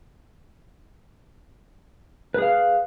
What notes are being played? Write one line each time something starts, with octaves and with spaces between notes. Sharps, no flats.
G#4 B4 F5